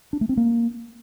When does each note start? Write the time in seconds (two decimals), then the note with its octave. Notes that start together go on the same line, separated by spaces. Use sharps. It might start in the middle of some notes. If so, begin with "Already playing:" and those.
0.13 D4
0.21 A3
0.29 C4
0.37 A#3